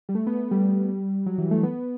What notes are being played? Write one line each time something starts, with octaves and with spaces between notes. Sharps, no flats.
G3
A3
B3
B3
G3
F#3
E3
A3
B3